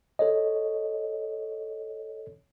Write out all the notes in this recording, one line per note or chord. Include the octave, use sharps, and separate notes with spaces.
A4 C#5 D#5